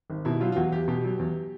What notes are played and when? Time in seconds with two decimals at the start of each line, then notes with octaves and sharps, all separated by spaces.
0.10 G#1
0.25 B2 E4
0.41 F#3 F4
0.52 F4
0.56 E2 F#4
0.72 E2 G4
0.88 B2 G4
1.04 F#3
1.19 E2